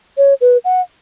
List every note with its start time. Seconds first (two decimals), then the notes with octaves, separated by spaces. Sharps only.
0.17 C#5
0.41 B4
0.65 F#5